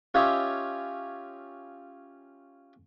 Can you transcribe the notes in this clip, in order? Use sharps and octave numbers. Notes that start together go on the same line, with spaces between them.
C#4 F4 G4 C#5 D#5 E5